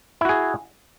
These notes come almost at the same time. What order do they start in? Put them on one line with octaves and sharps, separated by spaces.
E4 F#4 G#4